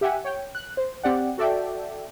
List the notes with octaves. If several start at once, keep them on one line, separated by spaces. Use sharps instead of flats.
G4 E5 F#5 G#5
C#5 G5
F#6
C5
C4 G4 D5 F#5
F#4 A4 D5 E5 G5